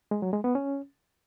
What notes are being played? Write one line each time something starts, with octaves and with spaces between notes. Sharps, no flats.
G#3
F#3
G#3
B3
C#4